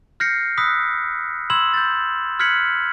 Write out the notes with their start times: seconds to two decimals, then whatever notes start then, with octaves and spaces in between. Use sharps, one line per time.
0.20 F6 G6 A#6 C7 C#7
0.57 B5 D#6 E6 F#6 B6
1.50 B5 C6 E6 G#6 E7 F#7
1.74 G6 A6
2.40 F6 F#6 G#6 B6 C#7 F#7